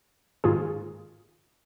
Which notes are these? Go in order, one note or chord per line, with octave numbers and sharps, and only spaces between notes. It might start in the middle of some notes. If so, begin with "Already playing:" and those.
G#2 D#3 A#3 F4 G#4